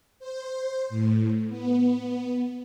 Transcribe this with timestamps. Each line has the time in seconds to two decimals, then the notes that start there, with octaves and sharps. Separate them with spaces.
0.19 C5
0.89 A2
1.49 B3